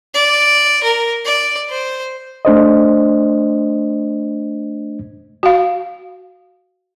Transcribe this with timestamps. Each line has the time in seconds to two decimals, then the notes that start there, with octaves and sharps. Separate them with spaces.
0.14 D5
0.83 A#4
1.26 D5
1.70 C5
2.45 A3 D4 C5 D#5
5.43 F#4 F5